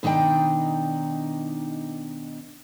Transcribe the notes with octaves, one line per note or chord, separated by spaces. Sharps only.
B2 D#3 D4 D#4 G5